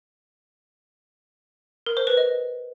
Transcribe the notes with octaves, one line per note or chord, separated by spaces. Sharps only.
A#4
C5
B4
D#5